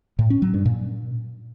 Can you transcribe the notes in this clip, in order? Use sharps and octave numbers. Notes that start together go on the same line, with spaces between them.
A2
C#4
F#3
G2
A#2